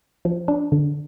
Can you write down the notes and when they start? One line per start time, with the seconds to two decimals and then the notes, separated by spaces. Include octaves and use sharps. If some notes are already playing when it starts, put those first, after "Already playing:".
0.25 F3
0.48 D4
0.72 D3